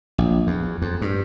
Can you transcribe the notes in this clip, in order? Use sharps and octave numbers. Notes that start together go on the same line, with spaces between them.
A#1
E2
F2
G2